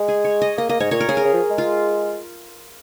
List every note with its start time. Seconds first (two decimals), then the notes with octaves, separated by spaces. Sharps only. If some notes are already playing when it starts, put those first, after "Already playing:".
Already playing: G#3
0.08 G#4
0.25 C#5
0.42 D#5
0.58 A#3 D#5
0.69 A#3 D#5
0.80 G#2 C#5
0.91 A#2 C#5
1.01 A#4
1.08 C#3 G#4
1.17 A#4
1.25 C#3
1.33 F3
1.50 G#3
1.58 F4